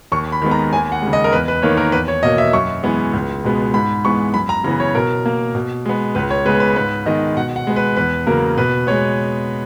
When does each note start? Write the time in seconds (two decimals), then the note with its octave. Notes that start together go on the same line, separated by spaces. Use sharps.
0.12 D#2 C#6
0.32 B5
0.42 D#3 G#3 B3
0.51 A#5
0.73 D#2 G#5
0.92 F#5
1.02 C#3 G#3
1.13 D#5
1.24 A#4
1.32 E2 B4
1.48 B4
1.62 D#3 A#3 C#5
1.77 A#4
1.92 E2 B4
2.08 C#5
2.23 B2 A#3 D#5
2.38 E5
2.53 F#2 C#6
2.83 E3 G#3 B3
3.13 C#2
3.44 B2 G#3 B3
3.74 G#2 B5
4.05 E3 G#3 B3 C#6
4.34 F#2 B5
4.49 A#5
4.64 C#3 E3 B3 A#5
4.80 C#5
4.95 B2 A#4
5.26 A#3
5.55 B2
5.86 G#3 B3
6.15 C#2 B4
6.31 C#5
6.45 C#3 G#3 B3 B4
6.60 B4
6.76 G#2 B4
7.06 D#3 G#3 B3 D#5
7.36 B2 F#5
7.56 F#5
7.67 G#3 B3
7.76 B4
7.96 E2 B4
8.27 C#3 F#3 A#3 A#4
8.58 B2 B4
8.87 G#3 B3 C#5